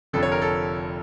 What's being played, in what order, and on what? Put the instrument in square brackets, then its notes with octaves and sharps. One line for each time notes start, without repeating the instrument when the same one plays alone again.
[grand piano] F1 F2 D3 F3 A4
C#5
A#4
A4